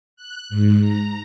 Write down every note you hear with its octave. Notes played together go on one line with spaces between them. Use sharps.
F#6
G#2
A#5